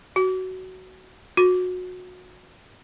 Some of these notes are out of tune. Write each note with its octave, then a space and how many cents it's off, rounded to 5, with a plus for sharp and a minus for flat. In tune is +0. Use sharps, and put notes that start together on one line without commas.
F#4 +10
F#4 -25